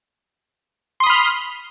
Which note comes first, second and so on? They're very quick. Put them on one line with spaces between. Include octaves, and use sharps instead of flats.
C6 D#6 B5 F6